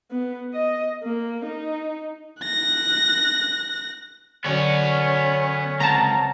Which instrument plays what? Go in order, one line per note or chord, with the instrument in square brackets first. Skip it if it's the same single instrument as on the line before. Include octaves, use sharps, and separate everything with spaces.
[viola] B3
D#5
A#3
D#4
[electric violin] F#6 A#6
[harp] F#2 D3 [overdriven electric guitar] B3 C#5 [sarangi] C#4
[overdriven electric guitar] C#2 [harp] C4 F#5 [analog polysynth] A5 A#5